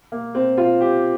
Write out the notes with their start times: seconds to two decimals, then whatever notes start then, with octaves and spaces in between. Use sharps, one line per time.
0.12 A#3
0.35 C4
0.58 F4
0.81 G4